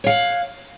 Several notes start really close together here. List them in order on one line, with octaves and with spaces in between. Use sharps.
C#5 F5 F#5